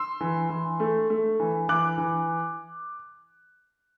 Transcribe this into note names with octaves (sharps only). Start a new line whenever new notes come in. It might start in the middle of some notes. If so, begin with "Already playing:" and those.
Already playing: C6 E6
E3
E3
A3
A3
E3
E3 D6 F#6
E3